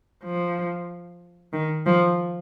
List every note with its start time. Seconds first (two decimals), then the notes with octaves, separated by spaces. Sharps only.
0.24 F3
1.53 D#3
1.86 F3